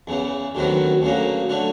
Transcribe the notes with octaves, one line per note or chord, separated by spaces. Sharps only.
E2 C#3 E3
D2 C3 D#3 F#3 B3
D2 C#3 F#3 A#3
D3 F#3 A3